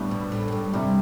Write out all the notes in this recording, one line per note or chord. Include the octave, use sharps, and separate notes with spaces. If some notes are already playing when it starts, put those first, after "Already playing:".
Already playing: A2 G3 B3 D4 G4
B2
A2
F#2
G2
G2 C3 G3